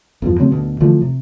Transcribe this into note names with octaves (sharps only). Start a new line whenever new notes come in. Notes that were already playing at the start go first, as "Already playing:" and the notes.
E2 G2 F3
C#3 F#3 A3 C4
D2 B2
D3 E3 F3 A3
C3